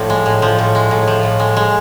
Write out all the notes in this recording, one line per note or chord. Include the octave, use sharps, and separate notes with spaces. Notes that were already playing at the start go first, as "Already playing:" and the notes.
Already playing: A2 F3 D4
G#3
A2
F3
A2
G#3
A2
F3
A2
G#3
G#3